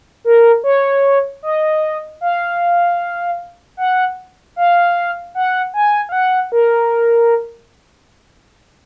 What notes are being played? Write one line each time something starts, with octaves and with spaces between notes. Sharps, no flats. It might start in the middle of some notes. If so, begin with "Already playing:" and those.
A#4
C#5
D#5
F5
F#5
F5
F#5
G#5
F5
F#5
A#4